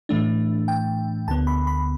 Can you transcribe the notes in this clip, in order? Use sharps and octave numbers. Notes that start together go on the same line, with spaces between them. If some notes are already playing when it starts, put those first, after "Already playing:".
A2 E3 A3 D4
G5
D2 D3 B3 A5
B5
B5